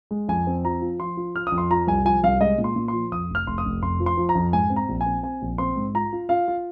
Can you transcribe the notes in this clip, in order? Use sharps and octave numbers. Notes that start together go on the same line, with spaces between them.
G#3
F2 G#5
C4
F3 A#5
F4
F3 C6
F4
F4 F6
D#6
F2
C6
F3 A#5
C2 G#5
F3 G#5
C2 F5
G#3 D#5
A#2
C6
A#2
F3 C6
F2 D#6
F1
F6
F1 C6
D#6
F1
F1 C6
F3
C6
F3
A#5
F2
G#2 G#5
C4
A#5
A#1
G#5
C4
C4 G#5
A#1
C4 C6
G#2
F4 A#5
F4
F4 F5
F4